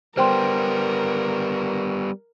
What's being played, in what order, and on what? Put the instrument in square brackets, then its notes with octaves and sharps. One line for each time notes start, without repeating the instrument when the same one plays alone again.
[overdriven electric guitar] G3 B3 [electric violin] A#4 [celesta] C5 G5 C6